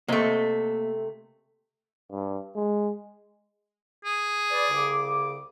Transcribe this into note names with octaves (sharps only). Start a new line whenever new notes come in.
C3 A3 A#3 C5 D#5
G2
G#3
G#4
B4 D5
C2 C#3 D6